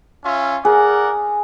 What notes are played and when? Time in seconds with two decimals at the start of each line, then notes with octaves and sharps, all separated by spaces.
0.25 C#4 F4 E5
0.65 G#4 A#4 D5 F#5